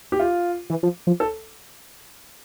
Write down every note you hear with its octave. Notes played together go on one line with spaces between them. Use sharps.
G4
F4
E3
F3
F3
A4